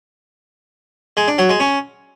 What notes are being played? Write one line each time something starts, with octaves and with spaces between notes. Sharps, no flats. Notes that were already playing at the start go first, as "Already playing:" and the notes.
G#3
D4
F#3
G#3
C#4